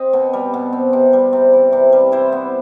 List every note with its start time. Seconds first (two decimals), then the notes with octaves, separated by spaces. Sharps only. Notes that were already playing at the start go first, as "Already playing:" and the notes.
Already playing: C4 D#5
0.13 B2
0.33 G3
0.54 B2
0.73 C4
0.93 C3
1.13 G3
1.33 C3
1.53 E3
1.73 C3
1.92 G3
2.12 E4 C5
2.32 B3